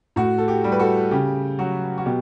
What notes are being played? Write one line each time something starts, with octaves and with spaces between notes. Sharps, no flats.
A2 F#4
A4
G4
G3
B4
F#4 A4
C#3 G4
F#3 F#4
F#4
B2 G4